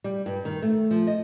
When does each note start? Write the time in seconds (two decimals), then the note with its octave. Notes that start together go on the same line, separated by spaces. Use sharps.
0.04 G3
0.26 G2
0.45 D#3
0.62 A3
0.91 F3
1.07 D#5